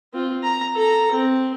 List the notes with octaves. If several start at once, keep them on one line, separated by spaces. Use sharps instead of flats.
C4 F4
A#5
A4 A#5
C4